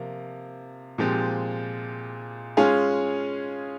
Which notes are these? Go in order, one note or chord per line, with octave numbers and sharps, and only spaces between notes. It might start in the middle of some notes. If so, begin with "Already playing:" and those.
Already playing: C3 F3 A#3
A#2 F3 G#3 C4 G4
G#3 C#4 F4 G#4